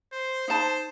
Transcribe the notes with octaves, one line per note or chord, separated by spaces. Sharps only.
C5
D#4 C5 A5